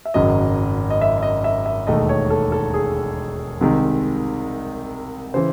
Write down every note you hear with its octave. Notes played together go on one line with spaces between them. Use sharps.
E5
G#1 F#2 C#3 F#3 D#5
D#5
E5
E5
D#5
E5
E5
E1 D#2 D#3 A3 D#5
C#5
A4
A4
G#4
C2 C3 D#3 G#3
C#3 E3 C5